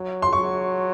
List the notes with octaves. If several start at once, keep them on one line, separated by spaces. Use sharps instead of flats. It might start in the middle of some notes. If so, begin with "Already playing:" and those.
Already playing: F#3
C6
F#3 C#6